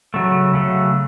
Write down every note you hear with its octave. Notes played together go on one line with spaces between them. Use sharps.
C#3 F#3 A3
C#3 F#3 A3